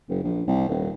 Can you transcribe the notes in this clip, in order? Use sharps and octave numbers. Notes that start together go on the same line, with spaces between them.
F#1
A#1
C2
D#1